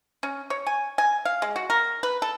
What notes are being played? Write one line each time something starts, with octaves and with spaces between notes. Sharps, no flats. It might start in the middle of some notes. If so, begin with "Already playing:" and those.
C#4
C#5
G#5
G#5
F5
G#3
F#4
A#4
B4
A4